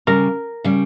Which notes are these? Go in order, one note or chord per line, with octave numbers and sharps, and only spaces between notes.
D#2 C#3 G3 A#4
C#3 G3